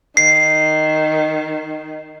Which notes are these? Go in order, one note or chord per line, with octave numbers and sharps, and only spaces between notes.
D#3 C7